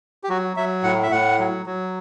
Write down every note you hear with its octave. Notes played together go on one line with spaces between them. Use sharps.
G4
F#3 F#4
F#3 E5
A2 F#5
E5
A2 F#5
F#3
F#3